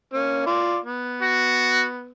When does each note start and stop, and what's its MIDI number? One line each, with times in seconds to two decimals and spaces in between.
0.14 0.46 58
0.14 0.46 61
0.46 0.77 65
0.46 0.77 74
0.84 2.11 59
1.22 1.85 66